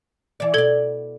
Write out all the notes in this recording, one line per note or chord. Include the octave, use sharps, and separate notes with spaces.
E3 D5
B2 A4 D5 G#6 G7